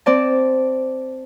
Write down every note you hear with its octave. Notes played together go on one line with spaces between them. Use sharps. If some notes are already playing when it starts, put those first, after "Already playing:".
C4 D5 A5